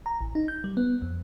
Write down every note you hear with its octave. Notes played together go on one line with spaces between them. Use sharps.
A#5
A1
D#4
G6
G3
B3
F2